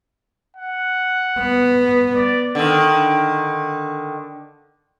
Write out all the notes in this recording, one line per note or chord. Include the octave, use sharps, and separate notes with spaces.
F#5
B3
D5
D3 D#3